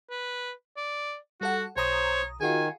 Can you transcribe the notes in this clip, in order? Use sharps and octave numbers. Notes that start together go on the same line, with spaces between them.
B4
D5
G3 F#4 A4 F#5
B1 C5 C#5 A#5 D#6
D#3 F4 F#4 G#4 G#5